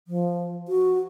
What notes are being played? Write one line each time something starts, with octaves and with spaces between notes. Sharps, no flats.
F3
F#4